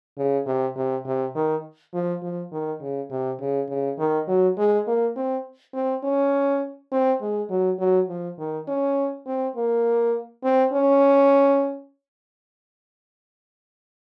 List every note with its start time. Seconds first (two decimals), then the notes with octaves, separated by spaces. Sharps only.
0.18 C#3
0.46 C3
0.76 C3
1.05 C3
1.35 D#3
1.94 F3
2.23 F3
2.52 D#3
2.81 C#3
3.11 C3
3.40 C#3
3.70 C#3
3.99 D#3
4.28 F#3
4.58 G#3
4.87 A#3
5.16 C4
5.74 C4
6.03 C#4
6.92 C4
7.21 G#3
7.50 F#3
7.79 F#3
8.08 F3
8.39 D#3
8.68 C#4
9.27 C4
9.56 A#3
10.44 C4
10.73 C#4